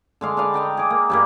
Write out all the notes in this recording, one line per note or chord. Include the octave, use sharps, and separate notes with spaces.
D3 G#3 F5
D4 B4 F5 G5
D#5 G5 A#5
G#4 D6
A#3
G2 G3 A#3